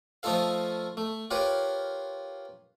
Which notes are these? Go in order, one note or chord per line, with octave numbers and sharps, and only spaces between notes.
F3 A3 D#4 F4 A4 F5
A3
F4 G4 A#4 B4 C#5